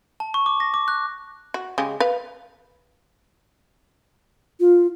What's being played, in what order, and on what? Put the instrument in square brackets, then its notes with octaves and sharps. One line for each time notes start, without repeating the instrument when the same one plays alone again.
[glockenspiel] A5
C#6
D6
A#6
D6
F#6
[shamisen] F#4
C#3 G#3 G4
B4 F5
[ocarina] F4